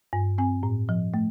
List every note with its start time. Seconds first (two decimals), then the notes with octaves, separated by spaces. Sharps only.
0.13 G2
0.38 C4 G#5
0.63 A2
0.89 F3
1.14 A3